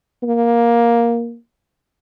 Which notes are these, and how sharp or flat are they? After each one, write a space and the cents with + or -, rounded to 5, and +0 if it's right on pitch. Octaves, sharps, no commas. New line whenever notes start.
A#3 +10